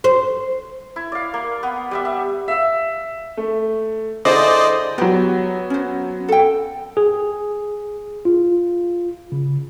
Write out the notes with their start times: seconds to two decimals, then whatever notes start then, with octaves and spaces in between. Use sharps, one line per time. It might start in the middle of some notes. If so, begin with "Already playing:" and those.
0.04 C5
0.96 E4
1.12 D5 F5
1.34 A#3
1.63 B3
1.91 G3 B3 E5
2.05 E5
2.48 E5 F5 E6
3.37 A3
4.25 D3 E4 G#4 C5 D5 D#5
4.98 F#3 B3 G4
5.70 C#4 C5
6.29 A4 G5
6.97 G#4
8.25 F4
9.32 C#3